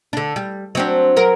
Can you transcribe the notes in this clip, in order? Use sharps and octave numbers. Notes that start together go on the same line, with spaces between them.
D3 D4
G3
F#3 C4 D4
F#3 A#4